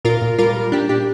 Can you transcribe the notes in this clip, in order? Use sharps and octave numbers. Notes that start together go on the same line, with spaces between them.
A#2 F4 A#4
A#2
G3 F4 A#4
G3
A#2 D4 G4
A#2 D4 G4